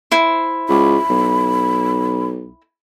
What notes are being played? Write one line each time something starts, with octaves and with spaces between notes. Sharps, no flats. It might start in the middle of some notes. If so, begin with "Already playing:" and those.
E4 C5
C#2 B5
B1